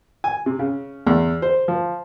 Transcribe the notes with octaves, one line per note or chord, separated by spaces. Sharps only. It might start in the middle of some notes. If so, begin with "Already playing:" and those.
G#5
C3
C#3
E2
C5
F3